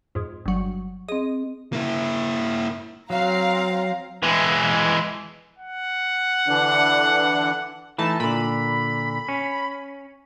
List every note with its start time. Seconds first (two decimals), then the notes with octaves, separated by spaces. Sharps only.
0.15 F2 G#2
0.46 G1 F#3
1.08 C4 G#4 D#5
1.73 A#3 E4
3.10 F#3 C4 F5 A#5
4.23 E3 G#3
5.59 F#5
6.47 D3 E3 D4
7.98 E3 A3 D#4 A5
8.20 A#2 D3 B5
9.28 C#4